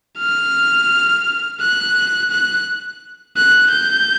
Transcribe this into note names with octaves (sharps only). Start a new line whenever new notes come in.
F6
F#6
F#6
F#6
G6